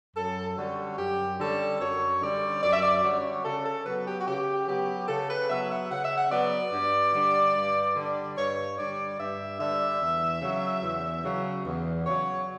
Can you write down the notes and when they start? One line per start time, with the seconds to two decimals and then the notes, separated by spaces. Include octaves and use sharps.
0.16 F#2 A4
0.57 D3 G3 C#4 F#4
0.98 F#2 G4
1.40 D3 G3 C#4 A4
1.80 F#2 C#5
2.22 D3 G3 C#4 D5
2.63 F#2 D5
2.73 E5
2.83 D5
3.03 D3 G3 C#4 F#4
3.45 C#3 A4
3.65 A4
3.86 F#3 B3 B4
4.07 G4
4.20 F#4
4.27 C#3 G4
4.68 F#3 B3 G4
5.08 C#3 A4
5.30 B4
5.50 F#3 B3 E5
5.71 F#5
5.91 C#3 F#5
6.04 E5
6.17 F#5
6.31 F#3 B3 D5
6.73 G2
7.14 D3 G3 D4
7.56 G2
7.96 D3 G3 D4
8.37 G2 C#5
8.78 D3 G3 D4 D5
9.19 G2 E5
9.60 D3 G3 D4 E5
10.01 E2
10.42 C#3 F#3
10.83 E2
11.24 C#3 F#3
11.65 E2
12.06 C#3 F#3 C#5